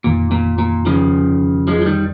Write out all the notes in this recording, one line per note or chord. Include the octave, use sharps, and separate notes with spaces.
G1 F2 A#2 D#3
A#2
A#2
C#3 F3
F3 G#3
F3
D#3 G3